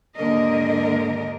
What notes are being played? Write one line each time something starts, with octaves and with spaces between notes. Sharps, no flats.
D#2 G#2 D3 A#3 A#4 D#5